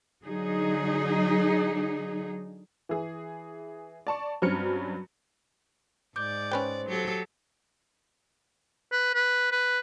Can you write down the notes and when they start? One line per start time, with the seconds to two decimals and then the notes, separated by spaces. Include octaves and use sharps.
0.25 D3 F#3 D#4 G#4
2.89 E3 G#4
4.07 D5 A5 C#6
4.42 G2 F#3 C4 C#4 F6 C#7
6.16 G#2 D5 D6 G6
6.52 C#4 B4 C5 G5
6.87 F#3 G4 A4
8.92 B4
9.15 B4
9.52 B4